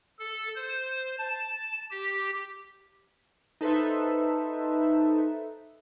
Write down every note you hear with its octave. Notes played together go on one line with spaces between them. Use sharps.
A4
C5
A5
G4
D#4 A4 B4 C5 E5